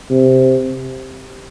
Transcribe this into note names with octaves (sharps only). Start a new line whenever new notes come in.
C3